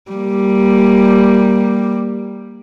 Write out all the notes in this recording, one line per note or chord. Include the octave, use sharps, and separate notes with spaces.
G3 A#3